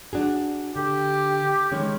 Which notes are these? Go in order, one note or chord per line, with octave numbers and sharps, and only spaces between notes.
D4 F#4 G#4
D3 G4
D#3 G#3 C#4